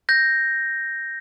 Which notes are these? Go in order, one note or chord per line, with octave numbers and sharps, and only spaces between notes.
G6 A#6